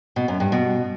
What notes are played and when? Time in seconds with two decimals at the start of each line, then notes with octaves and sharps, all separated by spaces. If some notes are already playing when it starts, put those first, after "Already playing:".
0.16 B2
0.28 F#2
0.40 G2
0.52 B2